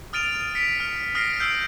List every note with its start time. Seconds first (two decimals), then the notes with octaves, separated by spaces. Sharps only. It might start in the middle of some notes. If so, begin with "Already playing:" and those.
0.13 D#6 F6 A6 D7 D#7 F7
0.55 B6 C#7 D7
0.80 F6
1.15 D#6 F6 A#6 C7 D7
1.39 E6 F6 G6 C7 D7